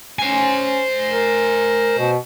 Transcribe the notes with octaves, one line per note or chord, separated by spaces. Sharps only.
C#4 C5 G#5
A#4
B2